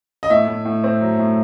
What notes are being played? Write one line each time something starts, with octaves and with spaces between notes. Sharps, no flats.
D#5
A2 E5
A2
A2
C4
F#3
A2